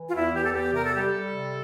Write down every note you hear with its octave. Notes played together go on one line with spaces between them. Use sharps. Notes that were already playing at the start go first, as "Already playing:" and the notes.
Already playing: E3
F4
E2 E4
E3 G4
A4
E2 G4
C3 A#4
A4
G3 G4
A4
G3
C3